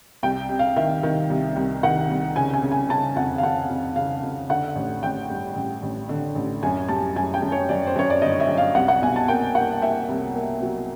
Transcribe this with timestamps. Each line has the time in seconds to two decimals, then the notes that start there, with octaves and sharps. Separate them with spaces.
0.23 C2 G5
0.49 C3
0.59 F5
0.76 D#3 E5
1.03 D#3
1.30 C2
1.56 C2
1.83 D#3 F#5
2.10 C2
2.36 C#3 G#5
2.53 G#5
2.62 C#3
2.72 G#5
2.89 C#3 A5
3.16 F2 F#5
3.38 F5
3.43 F2 F#5
3.70 F2
3.96 C#3 F5
4.23 F2
4.49 D3 F#5
4.75 A1
5.03 A1 G5
5.30 G2
5.55 A1
5.83 A1
6.09 D3
6.35 A1
6.63 F#2 G#5
6.88 G3 A5
7.16 F#2 G#5
7.34 G5
7.42 F#2
7.52 C#5
7.69 F#2 D5
7.87 C5
7.96 F#2 C#5
8.10 D5
8.22 G1 D#5
8.40 E5
8.48 F#2
8.57 F5
8.75 C2 F#5
8.88 F#5
9.02 B2 G#5
9.16 A5
9.28 A#3 G5
9.55 A#3 F#5
9.82 A#3 E5
10.09 C2
10.35 A#3
10.62 F#3